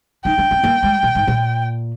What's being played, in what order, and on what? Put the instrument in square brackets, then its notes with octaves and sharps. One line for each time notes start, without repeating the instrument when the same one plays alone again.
[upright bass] D#4 [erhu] G5
[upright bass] D4
C4
A#3
G#3
A#2
G#2
A#2